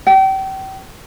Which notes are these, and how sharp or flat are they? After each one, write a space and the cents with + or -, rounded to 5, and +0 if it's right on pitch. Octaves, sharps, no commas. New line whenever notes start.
G5 -35